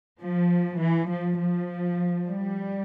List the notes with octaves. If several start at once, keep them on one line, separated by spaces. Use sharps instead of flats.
F3
E3
F3
F3
G3